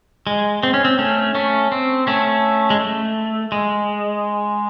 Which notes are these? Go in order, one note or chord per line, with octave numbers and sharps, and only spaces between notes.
G#3
C4
C#4
C4
A3 C#4
A3 C#4
C4
A3 C#4
G#3
A3
G#3